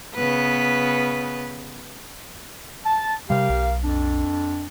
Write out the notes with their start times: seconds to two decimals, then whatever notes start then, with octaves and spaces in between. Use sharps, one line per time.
0.15 C#3 B3 B4
2.86 A5
3.30 C3 G3 G4 A#4 F5
3.50 B1
3.84 F2 D4